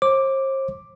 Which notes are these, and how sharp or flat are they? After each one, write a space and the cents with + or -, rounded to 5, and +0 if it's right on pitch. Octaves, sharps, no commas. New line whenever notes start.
C5 +40 D6 +0